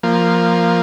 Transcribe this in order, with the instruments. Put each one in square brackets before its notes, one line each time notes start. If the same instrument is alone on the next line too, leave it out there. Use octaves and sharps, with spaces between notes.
[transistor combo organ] F3 A#3